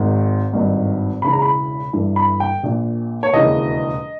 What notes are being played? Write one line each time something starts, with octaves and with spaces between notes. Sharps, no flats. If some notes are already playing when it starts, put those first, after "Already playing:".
Already playing: G#1 G#2 D#3
G#1 G2 D#3
E1 E2 C#3 E3 B5
A#5
B5
G1 G2 E3
B5
G5
A#1 A#2
C#5
E1 D#2 C#3 E3 D#5